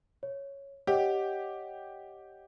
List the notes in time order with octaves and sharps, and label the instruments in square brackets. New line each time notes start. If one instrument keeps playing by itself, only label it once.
[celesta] C#5
[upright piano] G4 [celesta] C#5 D#5 F#5